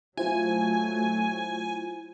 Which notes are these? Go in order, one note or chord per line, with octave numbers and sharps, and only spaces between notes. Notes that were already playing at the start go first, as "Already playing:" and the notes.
F#3 A3 E4 F4 C5 G#5